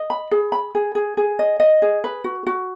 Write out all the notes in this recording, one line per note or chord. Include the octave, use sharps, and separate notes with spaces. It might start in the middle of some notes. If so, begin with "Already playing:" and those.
Already playing: D#5
B5
G#4
B5
G#4
G#4
G#4
D#5
D#5
G#4
B4
F#4
F#4